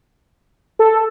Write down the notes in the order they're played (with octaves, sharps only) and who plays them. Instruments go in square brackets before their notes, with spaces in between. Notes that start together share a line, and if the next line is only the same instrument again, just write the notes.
[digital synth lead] A4